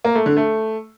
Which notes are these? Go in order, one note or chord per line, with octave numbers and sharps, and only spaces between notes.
A#3
A3
D3
A3